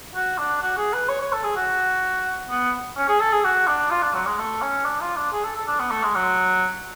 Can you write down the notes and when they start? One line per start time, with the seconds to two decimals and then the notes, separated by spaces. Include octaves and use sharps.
0.15 F#4
0.38 D4
0.62 F#4
0.77 G#4
0.93 B4
1.09 C#5
1.21 C#5
1.33 A4
1.44 G#4
1.56 F#4
2.50 B3
2.97 C#4
3.08 G#4
3.20 A4
3.32 G#4
3.44 F#4
3.67 D4
3.91 F4
4.03 D4
4.14 F#3
4.26 G#3
4.38 A3
4.62 C#4
4.85 D4
5.01 F4
5.16 D4
5.32 G#4
5.44 A4
5.56 A4
5.68 D4
5.79 B3
5.91 A3
6.03 G#3
6.15 F#3